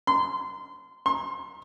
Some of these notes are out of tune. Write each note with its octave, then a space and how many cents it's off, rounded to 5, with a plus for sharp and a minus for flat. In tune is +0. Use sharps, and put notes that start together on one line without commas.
C6 -25
C6 +40